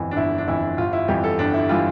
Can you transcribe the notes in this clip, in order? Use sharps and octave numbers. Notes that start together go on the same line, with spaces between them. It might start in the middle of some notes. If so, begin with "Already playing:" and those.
Already playing: G1 F2 E3
D4
G1 E4
D4
F2 E3 E4
G1 F4
E4
F2 E3 G3 G4
A4
G1 D4
E4
E3 G3 F4